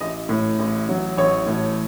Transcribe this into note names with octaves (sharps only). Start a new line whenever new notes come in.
A1 D#5
A2
A1
F#3
A1 C#5
A2